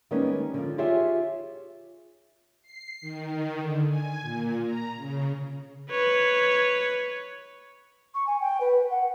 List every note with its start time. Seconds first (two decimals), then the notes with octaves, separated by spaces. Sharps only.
0.11 D#3 G3 G#3 A#3 B3 C#4
0.54 D3 F3
0.78 F4 G4 G#4 C#5 E5
2.63 C7
3.01 D#3
3.59 D3
3.87 G#5
4.21 A#2
4.63 A#5
4.96 C#3
5.90 B4 C#5
8.14 C#6
8.26 G#5
8.40 G5
8.60 B4
8.90 F#5